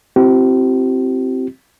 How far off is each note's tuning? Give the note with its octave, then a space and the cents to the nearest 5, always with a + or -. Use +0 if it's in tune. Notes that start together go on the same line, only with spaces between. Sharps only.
C4 +0 E4 +25 G4 -40